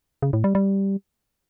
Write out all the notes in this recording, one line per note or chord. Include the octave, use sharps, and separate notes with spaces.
C#3
A2
G3
G3